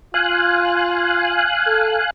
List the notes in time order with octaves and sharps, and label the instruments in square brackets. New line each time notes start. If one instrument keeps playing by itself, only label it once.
[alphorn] F4 [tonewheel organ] F5 G#5 F#6
[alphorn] A4